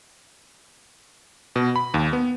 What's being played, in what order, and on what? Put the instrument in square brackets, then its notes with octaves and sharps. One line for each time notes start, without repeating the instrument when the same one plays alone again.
[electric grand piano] B2
B5
D#2
B3